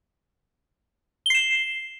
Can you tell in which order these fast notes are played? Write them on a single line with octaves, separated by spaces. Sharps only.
G7 C7 E7